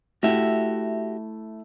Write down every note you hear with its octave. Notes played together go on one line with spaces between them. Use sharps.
A3 E4 F#4 G4 E5